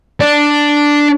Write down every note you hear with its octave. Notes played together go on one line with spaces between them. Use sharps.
D4